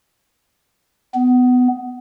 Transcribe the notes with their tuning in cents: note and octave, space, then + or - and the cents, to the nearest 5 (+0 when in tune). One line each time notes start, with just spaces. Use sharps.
B3 +20